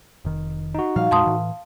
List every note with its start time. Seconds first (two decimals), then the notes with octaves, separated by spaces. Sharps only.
0.25 F1 D#3
0.75 D#4 F#4
0.96 A#2 F3 G3 F5
1.11 F2 A#2 G#3 A5 C6 D#6
1.26 A2 E3